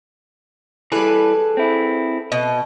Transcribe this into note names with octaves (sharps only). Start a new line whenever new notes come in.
E3 G3 G#4 A4 B4
C4 E4
B2 D#5